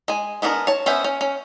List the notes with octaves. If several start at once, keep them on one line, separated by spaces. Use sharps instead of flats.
G#3 G#5
G#3 B3 D4 A4 A#4
C#5 A5
B3 C#4 B4 C5 E5
C#4
C#4